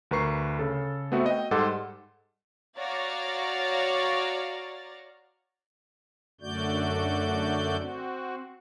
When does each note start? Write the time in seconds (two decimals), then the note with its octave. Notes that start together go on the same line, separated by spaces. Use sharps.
0.11 D2 A#4 B4 A#5 C#6 C7
0.59 C#3 A4
1.12 A3 B3 C4 F#4 E5
1.26 D#5 G5
1.51 G#2 G3 A4 F#5 C6 D6
2.78 F#4 C#5 D5 F5 A#5 A6
6.41 F#2 D3 A3 F#4 D5 G6
7.79 C4 F#4